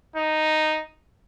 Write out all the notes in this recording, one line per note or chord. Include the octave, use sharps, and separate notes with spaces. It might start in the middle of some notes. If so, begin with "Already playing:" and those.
D#4